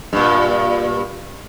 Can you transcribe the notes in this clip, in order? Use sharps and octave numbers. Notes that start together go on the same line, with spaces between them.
G2 A#2